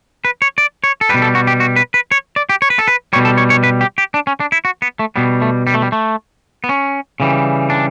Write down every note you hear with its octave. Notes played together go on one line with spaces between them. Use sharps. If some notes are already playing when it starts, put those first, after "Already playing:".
B4
C#5
D5
C#5
A4
B2 G3 B4
A4
F#4
G4
F#4
B4
B4
C#5
D5
G4
C#5
B4
A4
B4
B2 G3 C#5
A4
C#5
C#5
B4
G4
G4
D4
C#4
D4
E4
F#4
B3
A3
B2 G3 B3
A3
G3
A3
G3
A3
B3
C#4
C#3 E3 G3
D4